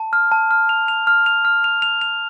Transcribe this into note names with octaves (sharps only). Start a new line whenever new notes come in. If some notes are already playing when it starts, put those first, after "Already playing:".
Already playing: A5
F6
A5
F6
F7
F7
F6
F7
F6
F7
F7
F7